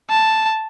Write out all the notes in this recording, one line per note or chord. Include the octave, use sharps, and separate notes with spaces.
A5